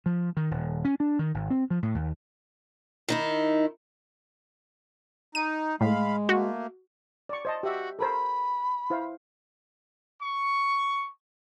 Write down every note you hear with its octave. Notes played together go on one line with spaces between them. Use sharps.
F3
D#3
D#1
C#4
D4
D#3
G#1
C4
F3
A2
D#2
D#3 D#4 E4
D#4 D#7
A2 G#3 F5 B5
A3 A#3 F#4
D5 C#6
C5 D#5 A5
F#4 G4 E5
A4 A#4 C5 B5
E4 C5 F5
C#6